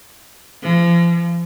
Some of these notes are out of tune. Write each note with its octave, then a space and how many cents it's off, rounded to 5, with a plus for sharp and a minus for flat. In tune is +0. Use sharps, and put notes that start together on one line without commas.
F3 -35